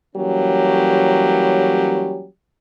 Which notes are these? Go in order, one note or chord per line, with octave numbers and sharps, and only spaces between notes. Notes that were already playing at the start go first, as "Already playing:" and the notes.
E3 F#3 G3 A#3 C#4 G4